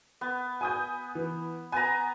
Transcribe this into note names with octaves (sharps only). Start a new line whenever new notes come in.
B3
G#5 D#6 G6
E3
B3 G#5 A#5